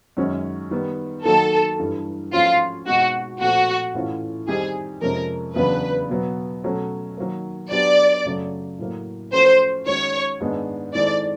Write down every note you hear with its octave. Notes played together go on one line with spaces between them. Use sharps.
F#2 D#3 G#3 C#4 F#4
D#3 G3 B3
D#3 F#3 A#3 D#4 F#4 A4
G2 E3 G3
G#2 F3 A3 C#4 F4 F#4
B2 G#3 C4 D#4 F#4
A#2 F3 A3 C4 F#4
A2 E3 A3 C#4 F4
D#3 G3 C4 D#4 G4 G#4
F2 C3 F3 G#3 C#4 A#4
E2 C#3 F#3 B3 D4 B4
B2 F#3 B3
B2 F#3 A3 C#4
D#3 F#3 A#3
F#3 B3 D4 G4 D5
F#2 C#3 F#3 A3
A2 F#3 A#3
F3 A3 C#4 F#4 C5
D#3 G#3 C#4 F#4 C#5
G#2 D#3 G#3 B3 D4
D#3 G#3 C4 E4 A4 D5